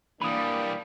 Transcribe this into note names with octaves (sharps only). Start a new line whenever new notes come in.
E3 G3 A#3 D4 B5 D#6